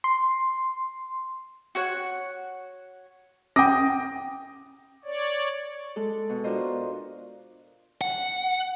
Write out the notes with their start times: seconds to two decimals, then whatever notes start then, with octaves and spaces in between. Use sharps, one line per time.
0.04 C6
1.75 F#4 C#5 F#5
3.56 C#4 G5 D6 D#6 A#6
5.04 C#5 D5
5.96 G#3 A4
6.29 B2
6.44 D4 F4 F#4 A#4 C5 D#5
8.01 F#5